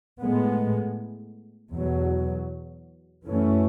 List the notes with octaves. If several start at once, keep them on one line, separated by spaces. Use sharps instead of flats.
A2 G#3 B3
E2 B2 F#3
F#2 E3 A3 C#4